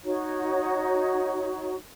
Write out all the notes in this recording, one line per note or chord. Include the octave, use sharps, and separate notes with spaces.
D#4 F#4 C#5